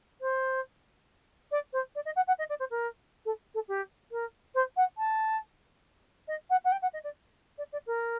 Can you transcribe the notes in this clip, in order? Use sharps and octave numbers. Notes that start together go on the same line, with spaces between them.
C5
D5
C5
D5
D#5
F#5
F#5
D#5
D5
C5
A#4
A4
A4
G4
A#4
C5
F#5
A5
D#5
F#5
F#5
G5
F#5
D#5
D5
D5
D5
A#4